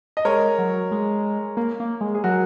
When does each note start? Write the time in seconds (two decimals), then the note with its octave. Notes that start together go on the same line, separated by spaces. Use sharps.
0.17 D#5
0.25 G#3 A#4 C#5
0.58 F#3
0.91 G#3
1.57 A#3
1.80 A#3
2.01 G#3
2.15 G#4
2.24 F#3 F#4 A#4